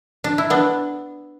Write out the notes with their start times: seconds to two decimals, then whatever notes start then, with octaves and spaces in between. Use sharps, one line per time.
0.24 D4
0.38 E4
0.50 B3 D4